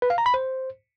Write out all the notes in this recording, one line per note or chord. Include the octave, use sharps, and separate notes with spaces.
B4
F5
A#5
B5
C5